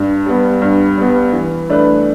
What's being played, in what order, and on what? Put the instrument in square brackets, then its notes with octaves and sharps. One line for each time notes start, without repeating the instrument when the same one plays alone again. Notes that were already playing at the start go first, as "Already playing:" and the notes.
Already playing: [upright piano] G2
G3 B3
G2
G3 B3
E3
A3 D4 B4